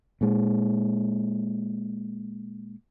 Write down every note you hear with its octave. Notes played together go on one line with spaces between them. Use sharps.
A#2 G#3